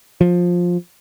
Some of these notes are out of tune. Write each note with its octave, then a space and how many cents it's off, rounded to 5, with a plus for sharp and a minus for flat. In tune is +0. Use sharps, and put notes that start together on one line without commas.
F3 +15